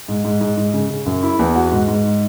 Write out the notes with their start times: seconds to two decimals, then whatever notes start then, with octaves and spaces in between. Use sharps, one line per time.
0.08 G#2
0.25 G#2
0.41 G#2
0.57 G#2
0.74 C#3
0.90 C#3
1.06 F#2
1.23 E4
1.39 E2
1.56 F#4
1.72 G#2
1.88 G#2